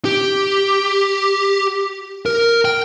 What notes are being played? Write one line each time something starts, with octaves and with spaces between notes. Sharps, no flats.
G4
A#4
G5